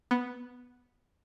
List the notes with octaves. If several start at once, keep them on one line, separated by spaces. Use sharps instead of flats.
B3